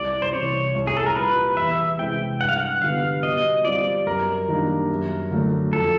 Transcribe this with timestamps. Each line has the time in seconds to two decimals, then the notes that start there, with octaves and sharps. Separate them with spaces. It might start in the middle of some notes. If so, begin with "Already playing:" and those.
Already playing: C2 D5
0.22 C5
0.33 C3 E3 C#5
0.74 C2
0.87 G#4
0.97 A4
1.06 A#4
1.16 A#2 G3 B4
1.57 E2 E5
1.98 C3 E3 G#3 C4 G5
2.40 G2 F#5
2.49 F5
2.57 F#5
2.82 D3 G3 B3 F5
3.23 B2 D#5
3.65 G3 C4 F4 D5
4.06 F#2 A#4
4.48 D#3 G3 A#3 D4
4.90 F#2
5.31 D3 F#3 A3 D4
5.72 F2 A4